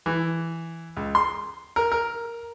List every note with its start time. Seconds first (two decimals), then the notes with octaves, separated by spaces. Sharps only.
0.06 E3
0.97 C#2
1.15 C6
1.76 A#4
1.92 A#4